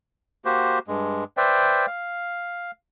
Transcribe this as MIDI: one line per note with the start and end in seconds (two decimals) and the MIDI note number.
0.45 0.79 58
0.45 0.79 66
0.45 0.79 67
0.45 0.79 72
0.88 1.24 43
0.88 1.24 56
1.37 1.86 71
1.37 1.86 72
1.37 1.86 74
1.37 1.86 76
1.37 1.86 79
1.87 2.71 77